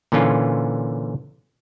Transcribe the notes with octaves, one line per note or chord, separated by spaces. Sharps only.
A#2 D3 E3 C#4 F4